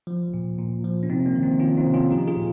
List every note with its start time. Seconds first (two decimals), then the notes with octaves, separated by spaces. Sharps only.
0.07 F3
0.34 A#2
0.59 A#2
0.84 F3
1.03 C#4
1.09 C3 C4 D#4
1.26 A#3 C#4
1.35 D#3
1.43 C4 D#4
1.60 D#3 C#4 F4
1.77 C4 D#4
1.86 C3
1.94 C#4 F4
2.11 F3 D#4 G4
2.28 F4 G#4
2.36 A#2